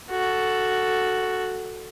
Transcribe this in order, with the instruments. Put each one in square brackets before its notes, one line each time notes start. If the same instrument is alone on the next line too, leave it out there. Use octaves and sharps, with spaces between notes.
[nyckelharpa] F#4 A4